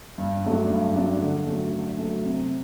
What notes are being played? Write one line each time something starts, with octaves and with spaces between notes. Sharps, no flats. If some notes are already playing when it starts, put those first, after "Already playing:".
G2
F#3 A3 D4
G2
F#3 A3 D4
D3
F#3 A3
D3
F#3 A3
C3